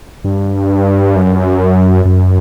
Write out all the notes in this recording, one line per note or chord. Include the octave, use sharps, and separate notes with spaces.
G2
F#2
F#2